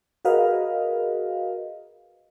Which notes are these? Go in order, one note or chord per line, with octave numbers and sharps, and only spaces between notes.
F#4 G#4 A#4 B4 D#5 F5